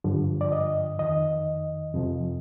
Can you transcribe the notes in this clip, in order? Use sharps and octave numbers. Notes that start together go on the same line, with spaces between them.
G2 D3 F3
D5
D#5
F2 D#3 D#5
F2 C3 F3